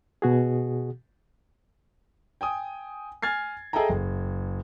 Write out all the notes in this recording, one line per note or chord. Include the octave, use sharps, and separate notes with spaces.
B2 F#4 G#4
G5 G#5 D#6
G#5 F6 G#6 A6 C7
G#4 A4 D#5 E5 G5 A#5
F#1